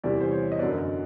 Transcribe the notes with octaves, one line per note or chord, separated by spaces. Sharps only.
E2 C3 E3 G3 D5
C5
C#5
D#5
F#2 D3 F#3 B3 D5
D#5